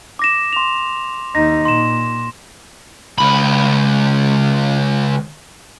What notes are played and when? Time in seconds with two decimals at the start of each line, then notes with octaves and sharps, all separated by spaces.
0.19 D6 A#6 E7
0.53 C6 F7
1.35 D#2 D#4 A#6
1.65 A#2 C6 E7
3.18 C#2 B5